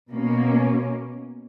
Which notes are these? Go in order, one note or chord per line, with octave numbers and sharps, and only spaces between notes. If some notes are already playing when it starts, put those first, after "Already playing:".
B2 A#3 C#4